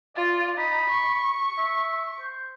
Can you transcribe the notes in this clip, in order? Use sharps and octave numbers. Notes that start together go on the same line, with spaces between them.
F4 D5
D#4 B5
C#6
E5
C5